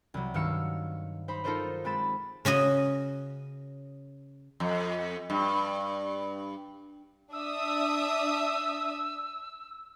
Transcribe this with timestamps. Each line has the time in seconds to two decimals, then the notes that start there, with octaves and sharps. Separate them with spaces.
0.14 C2 F#3
0.34 G2 D#3 F#3 F5 E6 C#7
1.28 D#4 C5 B5
1.44 D#4 F4 A4 A#4 C5 D#5
1.84 G#3 C4 B5 A6 E7
2.45 C#3 C#4 F#4 D#5
4.60 F2
5.30 G2
7.33 D4 E5 D#6 E6